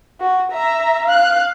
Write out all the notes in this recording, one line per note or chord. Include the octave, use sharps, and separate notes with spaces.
F#4
E5 A#5
F5 F#6